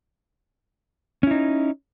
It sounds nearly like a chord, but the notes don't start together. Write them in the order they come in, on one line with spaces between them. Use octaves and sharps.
C#4 E4 D#4